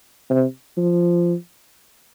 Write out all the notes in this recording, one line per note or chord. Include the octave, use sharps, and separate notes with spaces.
C3
F3